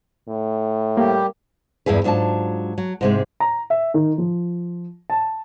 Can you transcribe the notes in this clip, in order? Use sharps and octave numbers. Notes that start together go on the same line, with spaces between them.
A2
G3 A#3 G4
E2 G2 E4 G#4 B4
G#2 F#3 D4 F4 A5
F#3
G#2 C3 G#3
A#5
E5
D#3
F3
A5